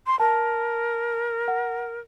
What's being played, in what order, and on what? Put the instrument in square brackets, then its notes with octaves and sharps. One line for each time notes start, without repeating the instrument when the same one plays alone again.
[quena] C6
[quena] A#4 [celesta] A5
[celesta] F#5